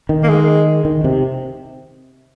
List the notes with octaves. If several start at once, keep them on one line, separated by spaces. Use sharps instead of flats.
D#3
A#3
G#3
D#3
C3